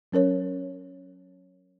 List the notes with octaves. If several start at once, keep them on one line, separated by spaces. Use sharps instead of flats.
F#3 C#4 A#4 C#5